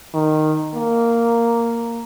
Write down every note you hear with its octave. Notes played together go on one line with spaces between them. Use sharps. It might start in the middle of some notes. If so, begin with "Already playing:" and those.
D#3
A#3